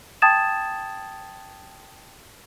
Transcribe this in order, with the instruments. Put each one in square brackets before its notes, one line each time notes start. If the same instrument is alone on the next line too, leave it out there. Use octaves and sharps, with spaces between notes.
[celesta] G5 A5 D#6 G#6 A6 E7